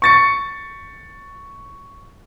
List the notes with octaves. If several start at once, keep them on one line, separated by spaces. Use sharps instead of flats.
C#6 A6 C#7